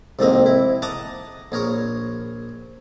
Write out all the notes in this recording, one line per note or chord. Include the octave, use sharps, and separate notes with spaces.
C2 F2 G#2 A#3 C4 D#5
E4
D#5 F#5 A5 A#5 D6 D#6
A#1 G#4 A#4 C#5